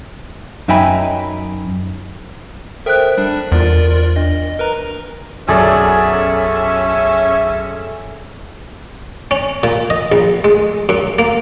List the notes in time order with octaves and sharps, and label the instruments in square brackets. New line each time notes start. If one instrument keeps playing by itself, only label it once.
[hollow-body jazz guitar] F#2 D#4 E5 G5 G#5 B5
[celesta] A4 C5 F#6 [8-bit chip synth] A#4 E5 G5
[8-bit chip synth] G3 D4
[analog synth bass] E2 [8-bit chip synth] F4 A#4 D5
[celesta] D4 [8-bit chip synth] D#5
[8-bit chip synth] A#4 B4 A#5
[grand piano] B1 F#2 F#3 [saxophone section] C#4 E5 [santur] G#4 A4 D5
[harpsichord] C#4
A#2
D#5
A#1
G#3
F#2
A#3